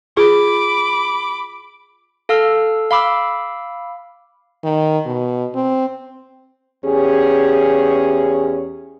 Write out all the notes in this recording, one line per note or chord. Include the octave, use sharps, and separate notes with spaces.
F4 G#4 B5 D6
A4 F5 E6 F6
F5 B5 D6 E6
D#3
B2
C4
E2 C#4 G4 G#4